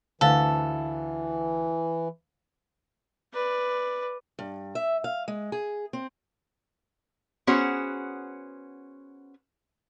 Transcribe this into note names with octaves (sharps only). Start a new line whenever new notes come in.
D2 D3 E3 A4 C5 F5
B4 D5
G2
E5
F5
G#3
G#4
C4
B3 C#4 F#4 G#4 C5